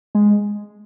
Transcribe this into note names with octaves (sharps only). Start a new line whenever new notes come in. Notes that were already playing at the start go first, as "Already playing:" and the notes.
G#3